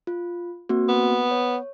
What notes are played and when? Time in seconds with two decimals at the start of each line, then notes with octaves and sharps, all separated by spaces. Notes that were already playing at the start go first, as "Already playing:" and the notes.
0.07 F4
0.69 A#3 C4 F#4
0.88 B3
1.31 C#5